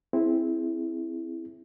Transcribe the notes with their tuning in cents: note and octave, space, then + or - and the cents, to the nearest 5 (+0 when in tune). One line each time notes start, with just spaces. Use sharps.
C4 +0 E4 +0 G#4 +0